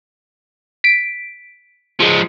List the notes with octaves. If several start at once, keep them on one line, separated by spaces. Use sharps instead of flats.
B6 D7
F3 G#3